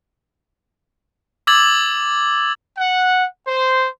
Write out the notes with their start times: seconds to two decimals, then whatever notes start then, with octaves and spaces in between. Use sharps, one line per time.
1.47 D6 E6 G#6 A6 F#7
2.78 F#5
3.47 C5